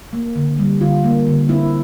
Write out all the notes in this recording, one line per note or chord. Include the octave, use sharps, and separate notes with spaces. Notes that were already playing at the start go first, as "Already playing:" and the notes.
A#3
D3
G3
D3 F4
A#3
D3
C4 E4